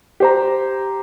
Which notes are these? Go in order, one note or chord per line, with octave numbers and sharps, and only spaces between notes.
G4 C5 A#5